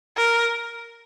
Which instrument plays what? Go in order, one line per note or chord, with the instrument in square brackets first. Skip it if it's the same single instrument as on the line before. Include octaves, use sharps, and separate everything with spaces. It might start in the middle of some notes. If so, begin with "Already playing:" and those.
[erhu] A#4